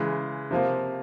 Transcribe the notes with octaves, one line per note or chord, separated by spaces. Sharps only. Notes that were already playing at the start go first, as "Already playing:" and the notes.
Already playing: C#3 E3 G#3
C3 F3 A#3